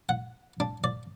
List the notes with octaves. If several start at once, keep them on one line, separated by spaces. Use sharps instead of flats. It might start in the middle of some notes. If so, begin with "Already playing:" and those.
F#5
D4
D5